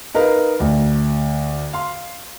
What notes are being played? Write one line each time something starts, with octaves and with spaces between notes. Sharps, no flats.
D#4 A#4 B4 F5
D2
F5 C6